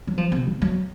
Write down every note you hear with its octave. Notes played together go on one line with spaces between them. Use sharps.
F#3
F3
C3
D#3
F#3